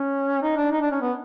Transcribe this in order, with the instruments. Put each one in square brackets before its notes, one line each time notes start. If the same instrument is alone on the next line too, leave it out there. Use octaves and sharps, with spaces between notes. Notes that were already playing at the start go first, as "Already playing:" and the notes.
Already playing: [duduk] C#4
D#4
D4
D#4
D4
C#4
B3